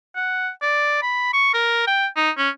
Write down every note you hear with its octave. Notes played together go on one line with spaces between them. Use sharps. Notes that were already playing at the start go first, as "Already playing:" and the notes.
F#5
D5
B5
C#6
A#4
G5
D#4
C#4